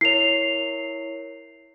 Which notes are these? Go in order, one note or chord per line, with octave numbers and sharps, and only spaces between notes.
E4 A#4 C#5 C7 F7